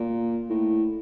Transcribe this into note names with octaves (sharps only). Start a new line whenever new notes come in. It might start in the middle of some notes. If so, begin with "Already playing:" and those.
Already playing: A#2
A2